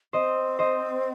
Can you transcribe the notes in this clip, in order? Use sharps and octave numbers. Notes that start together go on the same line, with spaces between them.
C4 C5 D#5
C5 D#5